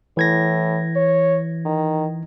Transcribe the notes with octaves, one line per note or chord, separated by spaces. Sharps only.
A2 E3 G#6 A#6
C#5
D#3